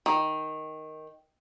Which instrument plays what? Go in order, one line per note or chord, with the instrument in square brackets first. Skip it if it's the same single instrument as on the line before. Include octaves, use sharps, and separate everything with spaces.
[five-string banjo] D#3